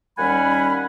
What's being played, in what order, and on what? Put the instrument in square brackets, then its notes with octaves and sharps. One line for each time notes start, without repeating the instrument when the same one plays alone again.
[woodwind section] D#2 G3 C#4 F#5 G#5 B5